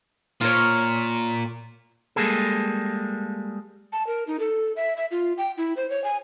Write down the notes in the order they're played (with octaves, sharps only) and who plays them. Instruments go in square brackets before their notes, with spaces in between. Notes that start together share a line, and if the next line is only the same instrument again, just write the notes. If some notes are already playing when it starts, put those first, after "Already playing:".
[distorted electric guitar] A#2 [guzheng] F4 A#4 C#5
[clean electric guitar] G3 G#3 A#3 G#4 A4
[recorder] A5
A#4
D#4
A4
E5
E5
F4
G5
E4
C5
C#5
G#5